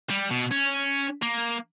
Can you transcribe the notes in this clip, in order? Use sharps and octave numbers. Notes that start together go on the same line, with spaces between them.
G3
B2
C#4
A#3